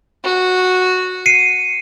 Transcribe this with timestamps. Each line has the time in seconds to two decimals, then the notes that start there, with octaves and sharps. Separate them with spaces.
0.24 F#4
1.26 C7 C#7 D#7